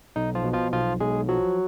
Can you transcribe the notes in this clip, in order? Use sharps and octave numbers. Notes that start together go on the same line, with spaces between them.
B1 D#4
F3 F4
B2
F3 F4
B1 F3 F4
B1 G#3 G#4
F3 F#3 F#4